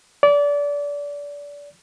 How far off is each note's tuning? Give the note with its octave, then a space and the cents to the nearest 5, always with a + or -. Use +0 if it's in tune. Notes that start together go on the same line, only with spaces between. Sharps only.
D5 -25